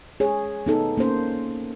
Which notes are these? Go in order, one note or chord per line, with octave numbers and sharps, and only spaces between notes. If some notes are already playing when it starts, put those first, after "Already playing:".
G#4 C#5
B3 D#4 A4
A#3 C#4 C5